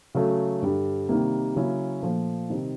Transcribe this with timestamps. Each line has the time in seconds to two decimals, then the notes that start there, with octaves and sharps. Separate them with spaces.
0.15 C#3 F#3 A3
0.62 G2 D3 G3
1.09 C3 D#3 G3 A#3
1.56 C#3 F#3 A#3 C#4 E4
2.03 A#2 F3 A3
2.50 C3 D#3 G3 C4 D#4